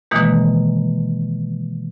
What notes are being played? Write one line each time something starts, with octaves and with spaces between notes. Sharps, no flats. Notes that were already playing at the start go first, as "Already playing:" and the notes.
B2 D#3 E3 G#3 A#3